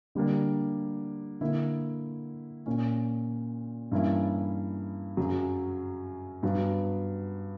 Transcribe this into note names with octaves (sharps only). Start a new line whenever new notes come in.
D3 G3 A#3 D4
D3 A#3 E4
A#2 A#3 C#4
G2 E3 A#3 C#4 E4
F#2 C#3 F#3
G2 F#3 B3